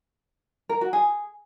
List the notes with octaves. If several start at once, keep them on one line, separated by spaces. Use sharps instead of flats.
A#4
F#4
G#4